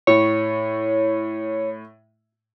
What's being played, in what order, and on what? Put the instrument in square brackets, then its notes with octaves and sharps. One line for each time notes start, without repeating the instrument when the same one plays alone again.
[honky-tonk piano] A2 [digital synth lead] C#5